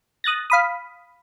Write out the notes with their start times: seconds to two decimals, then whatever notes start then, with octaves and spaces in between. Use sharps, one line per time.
0.24 D#6 F#6 A6 A#6
0.50 F5 B5 D#6